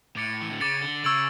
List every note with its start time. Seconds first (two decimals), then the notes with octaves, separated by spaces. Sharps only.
0.16 A2 D6 A6 C#7
0.42 E3
0.51 D3
0.60 C#3 D6 A6 C#7
0.82 D3
1.04 C#3 C#6 E6 G#6 D7 F#7